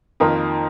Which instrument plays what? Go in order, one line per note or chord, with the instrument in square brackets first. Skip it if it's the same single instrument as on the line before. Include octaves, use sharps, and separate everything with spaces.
[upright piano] F2 D#3 A#3 F4 A#4